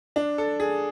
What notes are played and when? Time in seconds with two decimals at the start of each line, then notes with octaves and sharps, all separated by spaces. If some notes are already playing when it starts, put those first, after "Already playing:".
0.16 D4
0.38 A4
0.60 G#4